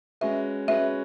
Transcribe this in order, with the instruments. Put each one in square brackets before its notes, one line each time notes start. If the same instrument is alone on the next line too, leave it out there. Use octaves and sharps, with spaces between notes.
[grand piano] G#3 C#4 F#4 B4 [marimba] E5
[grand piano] G#3 C#4 F#4 B4 [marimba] E5